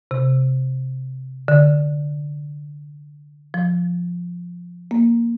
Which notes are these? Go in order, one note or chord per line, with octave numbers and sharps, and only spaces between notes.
C3
D3
F3
A#3